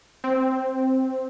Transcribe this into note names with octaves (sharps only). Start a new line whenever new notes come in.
C4